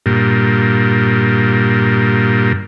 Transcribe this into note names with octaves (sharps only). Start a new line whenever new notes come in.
G2 A#2